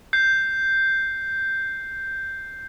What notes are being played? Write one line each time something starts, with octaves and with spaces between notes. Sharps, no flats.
G6 C7